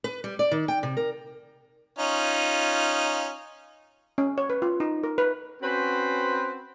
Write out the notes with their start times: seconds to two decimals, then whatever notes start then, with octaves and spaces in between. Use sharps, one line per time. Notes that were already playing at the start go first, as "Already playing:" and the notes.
0.04 B4
0.24 G3
0.39 D5
0.51 D#3
0.68 G5
0.83 C3
0.97 A#4
1.99 C#4 D#4 F4
4.18 C#4
4.38 C#5
4.50 B4
4.62 F4
4.80 D#4
5.03 A#4
5.18 B4
5.62 C4 C#4 F#4 B4 C5